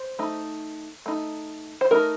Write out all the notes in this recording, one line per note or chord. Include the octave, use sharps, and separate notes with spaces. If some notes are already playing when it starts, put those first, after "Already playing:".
Already playing: C5
A3 D#4
A3 D#4
C5
A3 D#4 A#4